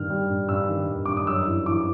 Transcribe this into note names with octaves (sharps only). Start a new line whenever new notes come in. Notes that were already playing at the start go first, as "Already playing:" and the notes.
Already playing: G2 D#3 F6
G3
G2
G2 E6
D#3
G2
G2 D6
D#6
F#2 E6
E3
E3 D6